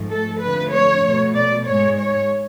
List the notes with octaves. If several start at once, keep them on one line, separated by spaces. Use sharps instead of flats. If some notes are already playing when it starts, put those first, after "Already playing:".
Already playing: G#2 F3 A3
A4
F2 D3 F3 A3 B4
C#5
B2 A3
D5
G#2 G#3 C#5
C#5